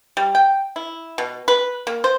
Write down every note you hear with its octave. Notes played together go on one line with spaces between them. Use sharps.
G3
G5
E4
B2
B4
A#3
C5